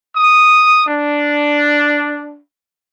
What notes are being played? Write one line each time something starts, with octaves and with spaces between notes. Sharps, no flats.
D#6
D4